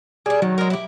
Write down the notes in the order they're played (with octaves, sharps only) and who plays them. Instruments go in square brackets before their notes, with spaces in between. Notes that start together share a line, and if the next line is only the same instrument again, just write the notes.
[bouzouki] G3 D4 [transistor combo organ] G#4
[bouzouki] D#3 [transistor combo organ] F#3
[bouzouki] G#3 A#4
E4 G4